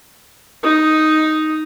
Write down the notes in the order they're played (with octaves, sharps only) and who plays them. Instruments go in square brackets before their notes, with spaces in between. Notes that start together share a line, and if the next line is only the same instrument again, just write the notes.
[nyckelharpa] D#4 D#6